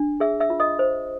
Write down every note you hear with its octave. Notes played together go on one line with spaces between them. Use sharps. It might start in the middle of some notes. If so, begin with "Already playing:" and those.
Already playing: D4
G#4 E5 E6
E5 E6
F4
D#5 D#6
C5